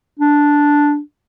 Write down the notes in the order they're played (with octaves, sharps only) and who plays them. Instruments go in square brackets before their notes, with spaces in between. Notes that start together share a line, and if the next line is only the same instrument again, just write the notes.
[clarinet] D4